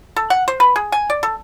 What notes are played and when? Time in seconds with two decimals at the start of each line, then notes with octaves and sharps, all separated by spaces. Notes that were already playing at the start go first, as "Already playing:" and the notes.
0.16 A4
0.30 F#5
0.48 C5
0.60 B4
0.76 G#4
0.92 G#5
1.10 D5
1.23 A4